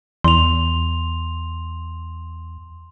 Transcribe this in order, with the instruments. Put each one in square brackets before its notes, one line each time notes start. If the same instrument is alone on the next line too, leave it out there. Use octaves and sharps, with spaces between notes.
[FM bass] E2 [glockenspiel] C6 F7